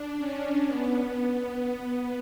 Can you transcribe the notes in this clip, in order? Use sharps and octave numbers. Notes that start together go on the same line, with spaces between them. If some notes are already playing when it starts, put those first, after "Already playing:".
Already playing: D4
C#4
B3